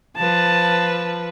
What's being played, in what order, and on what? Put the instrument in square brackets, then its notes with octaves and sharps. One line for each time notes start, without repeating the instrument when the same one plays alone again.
[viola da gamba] F3 B4 [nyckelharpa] A5